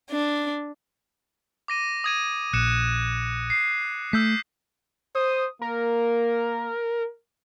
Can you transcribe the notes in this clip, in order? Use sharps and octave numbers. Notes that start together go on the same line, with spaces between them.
D4
D6 A#6 D#7
D#6 G#6 D#7
A#1 F#6 C#7 E7
C7
A3 E6 G6 B6
C5 D#6
A#3 A#4